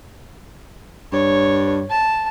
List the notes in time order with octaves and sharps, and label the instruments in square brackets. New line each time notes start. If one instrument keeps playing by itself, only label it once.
[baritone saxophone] G2 [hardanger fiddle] C#5
[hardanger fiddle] A5